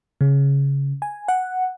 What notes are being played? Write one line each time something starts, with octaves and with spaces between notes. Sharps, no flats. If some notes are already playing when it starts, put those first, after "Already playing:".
C#3
G#5
F#5